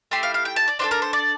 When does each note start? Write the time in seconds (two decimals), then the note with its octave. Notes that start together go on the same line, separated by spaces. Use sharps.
0.11 A3 E4 G4 C6
0.23 F5
0.34 F5
0.45 G5
0.56 A5
0.68 D5
0.79 D4 F4 A4 C5
0.91 A#4
1.02 C5
1.13 D5